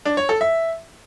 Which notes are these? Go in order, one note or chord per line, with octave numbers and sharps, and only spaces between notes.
D4
C#5
A4
E5